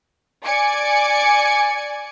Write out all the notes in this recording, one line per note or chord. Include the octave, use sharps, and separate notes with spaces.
D5 G#5 D6 C#7